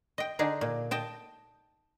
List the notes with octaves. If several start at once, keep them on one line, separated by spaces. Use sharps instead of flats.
D#5 G5
D3 D4 D#4 G#4
A#2
D#5 G5 A5